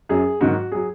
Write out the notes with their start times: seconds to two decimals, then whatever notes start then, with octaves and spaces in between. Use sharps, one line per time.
0.09 F#2 F#3 G#4
0.41 G#2 D#3 F#3 F#4
0.72 F#3 G#4